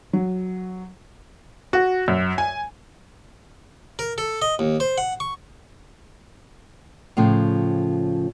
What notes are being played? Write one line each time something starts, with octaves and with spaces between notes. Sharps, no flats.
F#3
F#4
F#2
G#5
A#4
A4
D#5
D#2
C5
F#5
C#6
A2 C#3 F3